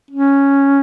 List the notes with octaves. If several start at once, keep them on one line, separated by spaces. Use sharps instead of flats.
C#4